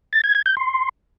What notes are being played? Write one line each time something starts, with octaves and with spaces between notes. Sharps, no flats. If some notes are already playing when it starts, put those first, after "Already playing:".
A6
G#6
G#6
G6
C6